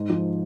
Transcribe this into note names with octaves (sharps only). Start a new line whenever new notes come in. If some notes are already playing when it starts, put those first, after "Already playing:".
Already playing: G#2
F3